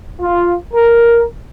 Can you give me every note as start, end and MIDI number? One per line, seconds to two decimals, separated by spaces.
0.21 0.53 65
0.74 1.23 70